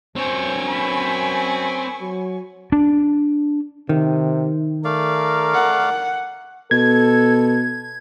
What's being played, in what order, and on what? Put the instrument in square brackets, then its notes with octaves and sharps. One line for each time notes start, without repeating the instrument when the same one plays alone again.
[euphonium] F#2 [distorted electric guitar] C4 C#5 [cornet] C5 [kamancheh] G#5 C#6
[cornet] B5
[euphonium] F#3
[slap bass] D4
[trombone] C3 [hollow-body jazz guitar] D#3
[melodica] A3 D5 F5 [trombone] A#4
[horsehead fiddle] F#5
[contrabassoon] B2 [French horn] A4 [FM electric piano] G#6